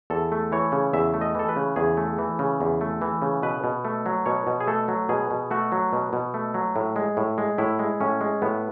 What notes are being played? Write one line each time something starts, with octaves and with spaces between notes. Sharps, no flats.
E2 A4
A3
E3 C#5
C#3
E2 E5
A3
D#5
E3 A4
B4
C#3
E2 G#4
A3
E3
C#3
E2
A3
E3
C#3
B2 B4
B2
A3
F#3
B2 C#5
B2
G#4
A3 A4
F#3
B2 G#4
B2
A3 F#4
F#3
B2
B2
A3
F#3
A2
G#3
A2
G#3
A2 E4
G#3
A2 C#4
G#3
A2 B3